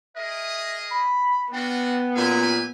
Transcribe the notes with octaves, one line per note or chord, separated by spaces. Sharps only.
G#4 A#4 D#5 E5
B5
B3 D4 F4 F#4 G5
F#2 A#2 G4 E5 G#5